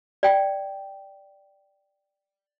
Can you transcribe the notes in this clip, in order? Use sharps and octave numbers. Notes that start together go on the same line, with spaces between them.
D5 G5